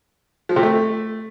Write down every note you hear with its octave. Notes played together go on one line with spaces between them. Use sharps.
F3
C3
A3